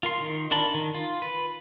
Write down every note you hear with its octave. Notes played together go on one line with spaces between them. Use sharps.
F4 A#4 C6
D#3
D4 F4 A#4 A5 B5
D#3
F4
B4